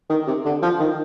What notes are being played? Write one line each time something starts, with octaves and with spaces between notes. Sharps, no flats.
D#3
C3
D3
F3
D#3